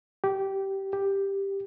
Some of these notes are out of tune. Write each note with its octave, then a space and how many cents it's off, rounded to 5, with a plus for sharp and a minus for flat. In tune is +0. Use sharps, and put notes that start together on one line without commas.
G4 -15
G4 +5